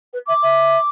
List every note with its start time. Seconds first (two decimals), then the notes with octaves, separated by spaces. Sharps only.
0.13 B4
0.27 E5 D6
0.42 E5